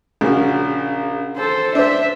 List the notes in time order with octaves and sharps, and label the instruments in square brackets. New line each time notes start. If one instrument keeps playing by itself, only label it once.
[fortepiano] A#1 C#3 F#4
[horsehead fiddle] A4 C5
[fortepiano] D4 C5 [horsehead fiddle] E5